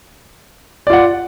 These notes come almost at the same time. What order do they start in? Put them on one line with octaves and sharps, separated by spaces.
D5 F4 F#5